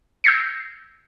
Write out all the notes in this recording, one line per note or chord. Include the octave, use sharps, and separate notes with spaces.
E6 G6 G#6 A#6 C7 C#7